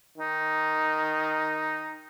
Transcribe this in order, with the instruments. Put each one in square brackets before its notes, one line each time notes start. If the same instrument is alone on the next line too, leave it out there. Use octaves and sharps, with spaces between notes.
[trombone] D#3 [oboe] D#4